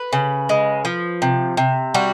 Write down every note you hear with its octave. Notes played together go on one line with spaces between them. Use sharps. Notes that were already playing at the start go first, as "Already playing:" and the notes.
Already playing: B4
C#3
G#3
F3
C3
C3
G3 F#4